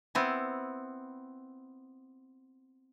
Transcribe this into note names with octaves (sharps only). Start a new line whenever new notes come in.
B3 C4 E4